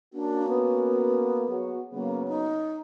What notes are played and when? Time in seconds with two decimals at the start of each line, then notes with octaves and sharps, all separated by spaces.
0.14 A#3 C#4 D4 F#4
0.49 B3
1.48 F#3 F#4 G#4
1.93 C#3 F#3 A#3 B3
2.28 D#4